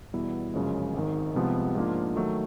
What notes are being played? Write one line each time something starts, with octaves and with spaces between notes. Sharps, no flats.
E2 B2 G3 B3 E4
G1 F#2 C#3 F3 G#3
G#1 G#2 D#3
C2 C3 F3 G#3 B3
G#2 F3 A#3 D4 F4
D#3 F#3 A3